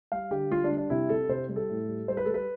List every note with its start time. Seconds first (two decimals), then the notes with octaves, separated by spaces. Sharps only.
0.12 G3 F5
0.31 D3 G4
0.51 G3 F4
0.64 D4
0.71 G3
0.77 D4
0.90 C3 E4
1.09 C3 A4
1.29 C3 C5
1.49 G3
1.56 A4
1.69 A2
1.88 G3
2.08 G3 C5
2.17 B4
2.25 G3 A4
2.34 B4